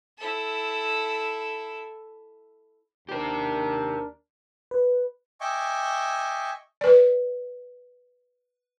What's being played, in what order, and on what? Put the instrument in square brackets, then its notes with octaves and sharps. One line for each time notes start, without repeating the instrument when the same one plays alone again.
[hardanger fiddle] E4 A4
[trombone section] D#2 D4 A#4 [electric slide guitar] G4 C5
[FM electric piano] B4
[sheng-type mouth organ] D#5 E5 G5 G#5 C#6 D6
[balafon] B4 D5